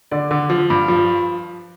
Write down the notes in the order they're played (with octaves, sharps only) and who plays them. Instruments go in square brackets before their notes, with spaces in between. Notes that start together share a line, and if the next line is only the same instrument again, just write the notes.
[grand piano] D3 D5
D3
F3
G2
F3